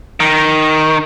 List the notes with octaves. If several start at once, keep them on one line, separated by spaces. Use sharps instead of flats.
D#3